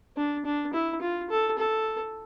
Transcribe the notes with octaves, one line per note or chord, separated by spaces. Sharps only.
D4
D4
E4
F4
A4
A4